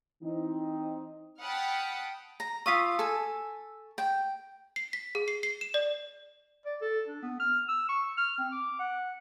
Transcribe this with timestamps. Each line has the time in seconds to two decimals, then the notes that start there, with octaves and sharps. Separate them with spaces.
0.22 E3 C4 D#4
1.42 F#5 G5 A5 B5 D#6 F6
2.40 A#5
2.66 F4 F5 C#6 D#6 E6 B6
2.99 A4 G#5
3.98 G5
4.76 C7
4.93 B6
5.15 G#4
5.28 C7
5.43 C7
5.61 E7
5.74 D5
6.66 D5
6.81 A4
7.08 D4
7.22 B3
7.40 F6
7.68 E6
7.89 C#6
8.18 F6
8.38 C4
8.52 D6
8.79 F#5